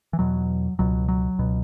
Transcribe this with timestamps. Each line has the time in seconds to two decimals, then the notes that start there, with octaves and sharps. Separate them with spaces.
0.13 E3
0.19 E2 B2 F#3
0.79 C#2 B2 F#3
1.08 F#3
1.39 C#2 B2